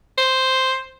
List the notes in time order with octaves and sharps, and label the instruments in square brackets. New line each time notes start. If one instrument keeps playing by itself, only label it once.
[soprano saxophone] C5